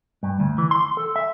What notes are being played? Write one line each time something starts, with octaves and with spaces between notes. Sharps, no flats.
G2
D2
E3
C6
A4
E5